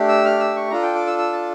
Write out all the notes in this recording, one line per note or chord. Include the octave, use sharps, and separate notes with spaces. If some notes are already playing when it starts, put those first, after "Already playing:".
Already playing: A3 D4 G4
E6
F6
E6
C#6
D4 F4 A4 A#5
G5
D6
E6
E6
A5